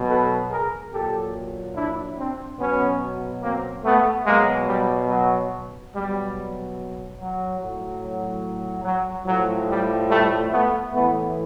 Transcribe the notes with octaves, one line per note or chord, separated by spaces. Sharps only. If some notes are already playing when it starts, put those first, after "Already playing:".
Already playing: B2 F#3
A4 B4
G#4 A#4
A#2 F#3 G4 A4
D4 E4
C4 D4
B2 F#3 B3 C#4
A#3 C4
A3 B3
B2 F#3 G#3 A#3
G3
F#3
B2 F#3 G3
F#3
A2 F#3
F#3
A2 F3 F#3
G3
G3 A3
A3 B3
A2 E3 A3 B3